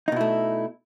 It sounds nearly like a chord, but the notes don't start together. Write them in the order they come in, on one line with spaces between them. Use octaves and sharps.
D#4 B2 E4 A3